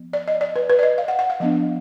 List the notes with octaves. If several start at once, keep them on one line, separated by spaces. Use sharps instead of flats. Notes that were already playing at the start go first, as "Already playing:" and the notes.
Already playing: F3 B3
D5
D#5
D5
B4
B4
D5
D#5
F5
F#5
F#5
F5
F3 B3 D4 D#5